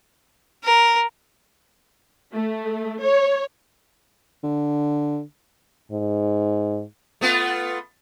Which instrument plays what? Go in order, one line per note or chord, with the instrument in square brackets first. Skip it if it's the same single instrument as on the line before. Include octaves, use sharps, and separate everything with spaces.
[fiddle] A#4
[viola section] A3
C#5
[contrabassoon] D3
[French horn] G#2
[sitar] A3 B3 F4